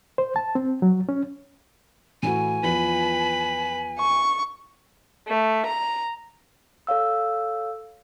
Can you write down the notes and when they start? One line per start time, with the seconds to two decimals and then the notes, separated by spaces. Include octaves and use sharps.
0.18 C5
0.36 A5
0.55 C4
0.82 F#3
1.09 C#4
2.23 A2 E3 F#4 G#5
2.63 E2 F3 F4 B4 B5
3.99 C#6
5.27 A3
5.66 A#5
6.87 A4 C#5 F5 E6